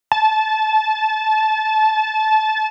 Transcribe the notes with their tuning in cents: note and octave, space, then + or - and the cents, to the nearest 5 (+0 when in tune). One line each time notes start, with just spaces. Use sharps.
A5 -20